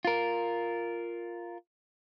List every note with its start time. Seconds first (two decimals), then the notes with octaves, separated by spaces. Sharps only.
0.05 F4 A#4